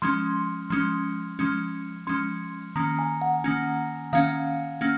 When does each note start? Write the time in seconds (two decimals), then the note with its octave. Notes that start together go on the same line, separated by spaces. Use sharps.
0.02 F3 G#3 C#4 C6
0.70 F3 G#3 C#4
1.39 F3 G#3 C#4
2.07 F3 G#3 C#4 C6
2.76 D#3 A#3 C#4 A#5
2.99 G#5
3.22 F#5
3.44 D#3 A#3 C#4
4.13 D#3 A#3 C#4 F5
4.81 A#3 C#4